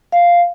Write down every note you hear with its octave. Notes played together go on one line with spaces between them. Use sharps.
F5